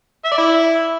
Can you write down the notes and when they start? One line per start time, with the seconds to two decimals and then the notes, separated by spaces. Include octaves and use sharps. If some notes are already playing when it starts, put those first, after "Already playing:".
0.25 E5
0.31 D5
0.38 E4